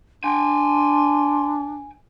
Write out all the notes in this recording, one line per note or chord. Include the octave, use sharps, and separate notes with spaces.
D4 G5 G#5 C6